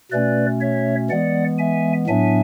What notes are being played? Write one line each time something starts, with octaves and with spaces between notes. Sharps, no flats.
B2 A3 C#4 B4 D5
C#5 E5
E3 G#3 B3 D5 F#5
E5 G#5
A2 F#3 B3 D4 E5 G#5